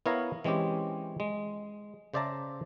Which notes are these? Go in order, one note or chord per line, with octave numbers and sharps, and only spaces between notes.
B3 E4 A#4 C#5 F5 A#5
E3 G#3 C4 C#4 G4
G#3
C#3 C5 D5 E5 A5 A#5